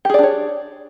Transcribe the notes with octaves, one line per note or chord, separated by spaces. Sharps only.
D4 G4 G#4 C#5 D5